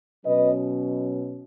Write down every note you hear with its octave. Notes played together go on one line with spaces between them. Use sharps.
B2 F#3 C#4 B4 D#5